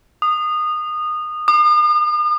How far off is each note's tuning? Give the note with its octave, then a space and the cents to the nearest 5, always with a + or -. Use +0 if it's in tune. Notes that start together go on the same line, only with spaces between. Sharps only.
D#6 -20
D#6 -45